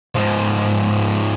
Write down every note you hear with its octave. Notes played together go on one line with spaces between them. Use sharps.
G#2 F3